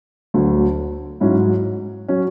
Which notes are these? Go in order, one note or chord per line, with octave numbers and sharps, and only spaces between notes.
D2 D3 F#3
G#2 F#3 C#4 E4
F#3 C#4